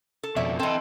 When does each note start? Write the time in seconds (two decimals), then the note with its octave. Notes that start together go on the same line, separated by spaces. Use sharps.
0.23 A4
0.36 F2 B2 C#5 D5 E5
0.59 E3 C4 A4 D#5